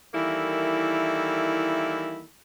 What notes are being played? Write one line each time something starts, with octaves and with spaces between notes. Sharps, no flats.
D#3 E3 G3 A#3 E4 A4